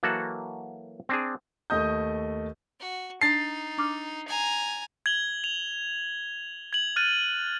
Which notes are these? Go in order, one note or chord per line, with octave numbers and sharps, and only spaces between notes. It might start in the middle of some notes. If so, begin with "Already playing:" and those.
E3 F#3 A#3 F#4 A4 F#5
C4 D4 G#4
D#2 A3 D#5 D#6 G6
F#4
D4 D#4 A5 A6 C7
D4 D6 F6
G#5 A#5
G#6 F#7 G7
F7
G#6 F#7
F6 F#6 A6 D#7